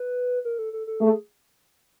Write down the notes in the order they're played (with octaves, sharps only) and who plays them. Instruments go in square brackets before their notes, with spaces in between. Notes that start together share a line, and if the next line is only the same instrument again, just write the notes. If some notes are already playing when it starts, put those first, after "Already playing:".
Already playing: [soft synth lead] B4
A#4
A4
A4
A4
[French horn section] A3 [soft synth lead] G#4